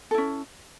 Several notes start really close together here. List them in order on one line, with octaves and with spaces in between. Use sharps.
A4 E4 C#4